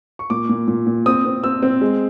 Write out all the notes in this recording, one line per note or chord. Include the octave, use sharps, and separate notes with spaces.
C#6
A#2 D6
A#2
A#2
A#2
C4 D#6
C4
C4 E6
C4
G#3